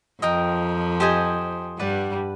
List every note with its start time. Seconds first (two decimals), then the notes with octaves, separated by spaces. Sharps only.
0.22 F2 F3 A#4 D#5 G5
1.00 G4 C5 D#5 G#5
1.78 G2 G3 B4 D5 F#5